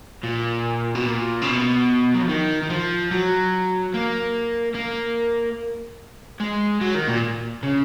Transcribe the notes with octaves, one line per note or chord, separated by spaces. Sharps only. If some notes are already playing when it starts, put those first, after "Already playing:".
A#2
B2
A#2
C#3
B2
F#3
F3
D#3
D#3
F3
F#3
A#3
A#3
G#3
F#3
D#3
A#2
C#3